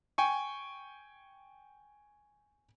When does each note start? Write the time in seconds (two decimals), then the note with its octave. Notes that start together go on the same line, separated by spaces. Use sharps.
0.18 G5 G#5 C#6